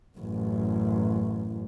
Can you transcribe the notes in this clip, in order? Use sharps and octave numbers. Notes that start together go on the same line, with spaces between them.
A1 F#2